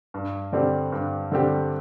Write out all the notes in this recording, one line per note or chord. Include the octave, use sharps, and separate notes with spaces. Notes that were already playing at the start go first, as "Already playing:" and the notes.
G2
D3 G3 C4 G4
G2
D3 G3 C4 G4